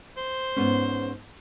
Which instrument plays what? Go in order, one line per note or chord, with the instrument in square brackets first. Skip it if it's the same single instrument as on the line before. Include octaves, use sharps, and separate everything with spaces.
[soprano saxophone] C5
[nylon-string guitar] G#2 B3 C#4